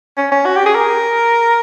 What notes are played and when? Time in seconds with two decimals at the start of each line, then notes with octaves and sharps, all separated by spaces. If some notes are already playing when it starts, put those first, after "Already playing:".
0.17 C#4
0.32 C#4
0.45 F#4
0.56 G4
0.66 G#4
0.75 A#4